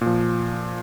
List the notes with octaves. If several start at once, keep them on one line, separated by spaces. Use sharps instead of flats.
A#2 F3